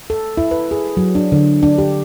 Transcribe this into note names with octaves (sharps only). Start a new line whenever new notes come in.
A4
E4
B4
G#4
F#3
D4
D3
D4
G4